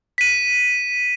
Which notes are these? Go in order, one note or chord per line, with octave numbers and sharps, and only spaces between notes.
B6 D#7